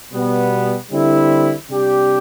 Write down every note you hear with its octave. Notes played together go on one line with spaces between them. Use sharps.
B2 G3 B3
D3 G3 C4 E4
C3 G3 D4 G4